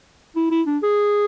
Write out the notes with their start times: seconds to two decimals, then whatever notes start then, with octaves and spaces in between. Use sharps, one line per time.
0.36 E4
0.51 E4
0.67 D4
0.83 G#4